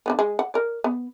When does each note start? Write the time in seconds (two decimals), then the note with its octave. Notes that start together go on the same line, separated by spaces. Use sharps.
0.06 D3 F3 B3
0.19 G#3
0.39 F#5
0.54 A#4 D5
0.84 B3